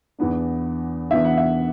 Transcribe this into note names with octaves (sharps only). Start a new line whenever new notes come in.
E2 E3 B3 D4
E2 E3 B3 D4 E5
F#5
E5